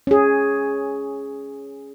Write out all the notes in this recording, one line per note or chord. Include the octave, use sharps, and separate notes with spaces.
C#4 G#4